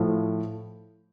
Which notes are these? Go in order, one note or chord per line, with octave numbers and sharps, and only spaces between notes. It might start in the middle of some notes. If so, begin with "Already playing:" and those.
Already playing: A2 F3 A3